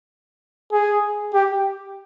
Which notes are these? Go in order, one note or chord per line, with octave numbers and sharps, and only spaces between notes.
G#4
G4